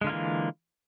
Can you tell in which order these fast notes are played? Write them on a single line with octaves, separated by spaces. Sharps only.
G#3 D3 F4 A#3 E3